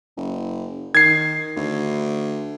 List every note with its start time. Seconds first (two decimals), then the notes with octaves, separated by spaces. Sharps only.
0.17 F#1
0.95 D#3 G#6 C7
1.57 D2